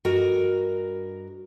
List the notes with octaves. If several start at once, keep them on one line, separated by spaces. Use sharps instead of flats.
G2 F#4 A#4 D#5